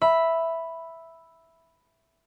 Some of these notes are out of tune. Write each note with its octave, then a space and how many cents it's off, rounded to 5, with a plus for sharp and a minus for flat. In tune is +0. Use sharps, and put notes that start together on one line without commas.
E5 +0 B5 +0